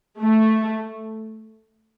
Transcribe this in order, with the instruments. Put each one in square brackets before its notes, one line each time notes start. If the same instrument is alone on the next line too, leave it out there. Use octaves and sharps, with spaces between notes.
[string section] A3